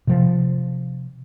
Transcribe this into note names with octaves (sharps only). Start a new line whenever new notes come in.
C3 F3